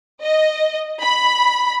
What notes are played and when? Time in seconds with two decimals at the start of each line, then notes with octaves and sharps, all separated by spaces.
0.22 D#5
1.01 B5